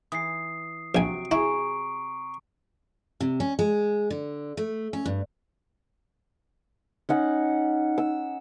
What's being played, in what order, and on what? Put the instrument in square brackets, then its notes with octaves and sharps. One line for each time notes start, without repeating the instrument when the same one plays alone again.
[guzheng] E3 [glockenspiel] D#6 C7
[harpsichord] A#1 G#5 [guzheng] C3 F#3 [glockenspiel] D7
[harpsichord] E4 [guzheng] G#4 [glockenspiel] A#5 C#6 D7
[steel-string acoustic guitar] C3
C#4
G#3
D3
A3
C#4
G2
[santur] C#4 D#4 F#5
E6